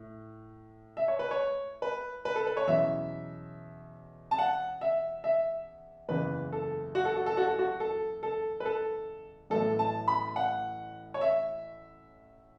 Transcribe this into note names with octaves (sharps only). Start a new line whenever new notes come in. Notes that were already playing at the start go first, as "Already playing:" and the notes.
Already playing: A2
E5
C#5
B4
C#5
B4
B4
A4
B4
C#5
E2 B2 F#3 C#4 E4 E5
A5
F#5
E5
E5
F#1 E2 C#3 E3 B4
A4
F#4
A4
F#4
A4
F#4
A4
F#4
A4
A4
B4
A4
A1 A2 F#3 B3 A4
A5
B5
F#5
C#5
E5